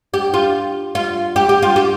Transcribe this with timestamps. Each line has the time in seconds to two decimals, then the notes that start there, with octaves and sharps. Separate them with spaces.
0.14 G4
0.34 F4
0.95 F4
1.36 G4
1.49 G4
1.62 F4
1.76 G4